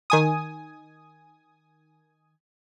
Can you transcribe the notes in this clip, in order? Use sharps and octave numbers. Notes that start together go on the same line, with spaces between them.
D#3 G#5 D#6